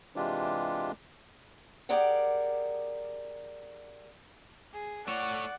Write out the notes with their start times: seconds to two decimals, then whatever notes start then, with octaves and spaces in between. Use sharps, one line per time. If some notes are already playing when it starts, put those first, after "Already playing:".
0.16 C3 E3 G#3 D4 F4 G4
1.89 G4 G#4 A#4 D5 F#5
4.74 G#4
5.07 A3 C#5 D5 F#5